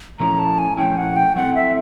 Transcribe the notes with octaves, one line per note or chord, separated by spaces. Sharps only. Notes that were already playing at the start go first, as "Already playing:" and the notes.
A#2 F3 A3 C#4 E4 A#5
A5
G#5
A#2 F3 A3 C#4 E4 G5
F#5
G5
F#3 A3 C4 E4 A4 F#5
E5